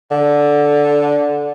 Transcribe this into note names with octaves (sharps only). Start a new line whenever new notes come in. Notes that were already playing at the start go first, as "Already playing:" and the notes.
D3